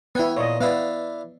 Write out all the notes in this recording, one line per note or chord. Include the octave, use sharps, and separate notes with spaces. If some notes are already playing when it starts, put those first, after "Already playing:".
B3 E4 C#5 G5 G#5
A#2 C#5 D#5
B3 D4 E4 F5